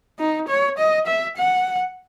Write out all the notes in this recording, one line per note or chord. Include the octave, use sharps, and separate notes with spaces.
D#4
C#5
D#5
E5
F#5